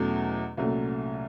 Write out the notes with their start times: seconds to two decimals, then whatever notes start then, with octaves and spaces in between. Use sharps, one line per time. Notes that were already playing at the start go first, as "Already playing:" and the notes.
Already playing: E2 B2 F#3 A3 C#4
0.57 C2 A#2 F#3 A3 C#4